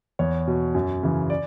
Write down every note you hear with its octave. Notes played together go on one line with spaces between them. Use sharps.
E2 C#5
B2
F#2
C#3 E3
D5